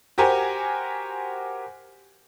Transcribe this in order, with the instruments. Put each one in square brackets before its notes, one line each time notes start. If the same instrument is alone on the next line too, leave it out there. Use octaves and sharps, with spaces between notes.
[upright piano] F#4 G4 A#4 C5 G#5